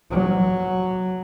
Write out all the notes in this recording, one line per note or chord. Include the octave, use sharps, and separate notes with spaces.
F#3